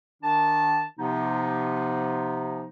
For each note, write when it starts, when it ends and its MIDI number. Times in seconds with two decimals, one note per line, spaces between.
0.23 0.83 51
0.23 0.83 62
0.23 0.83 81
0.98 2.66 48
0.98 2.66 53
0.98 2.66 59
0.98 2.66 63